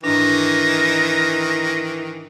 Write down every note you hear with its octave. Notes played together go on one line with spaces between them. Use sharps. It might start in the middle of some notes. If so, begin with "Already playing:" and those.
G#2 D#3 E3 D4 A#6